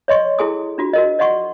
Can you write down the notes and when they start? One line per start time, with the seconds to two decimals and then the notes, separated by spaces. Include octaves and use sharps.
0.08 C#5 D#5 C6 C#6
0.39 E4 G#4 A4 G#5 C6 D#6
0.78 D4 F4 F#4
0.93 F#4 A#4 D#5
1.19 D5 D#5 F#5 C6 C#6